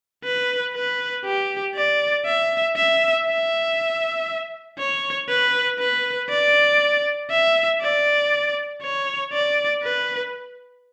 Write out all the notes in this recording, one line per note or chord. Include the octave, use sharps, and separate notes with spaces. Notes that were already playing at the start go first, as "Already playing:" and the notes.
B4
B4
G4
D5
E5
E5
E5
C#5
B4
B4
D5
E5
D5
C#5
D5
B4